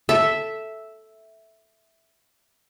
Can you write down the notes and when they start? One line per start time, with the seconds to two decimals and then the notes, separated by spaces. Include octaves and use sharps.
0.09 A4 E5